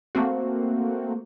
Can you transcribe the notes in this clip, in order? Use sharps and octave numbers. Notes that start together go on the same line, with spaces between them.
A3 A#3 C4 F#4